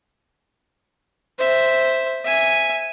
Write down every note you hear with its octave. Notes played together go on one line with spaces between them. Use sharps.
C5 E5
E5 G#5